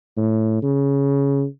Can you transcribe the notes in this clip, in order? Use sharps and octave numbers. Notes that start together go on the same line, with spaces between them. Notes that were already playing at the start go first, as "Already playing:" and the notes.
A2
C#3